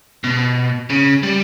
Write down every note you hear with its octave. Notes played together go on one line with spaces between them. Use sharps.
B2
C#3
G3